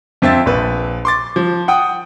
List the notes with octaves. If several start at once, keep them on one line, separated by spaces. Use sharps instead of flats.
F2 C4 E5 A6
A#1 B4
C6 D6 A6
F3
F#5 G5 D#6